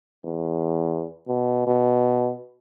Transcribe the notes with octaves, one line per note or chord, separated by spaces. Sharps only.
E2
B2
B2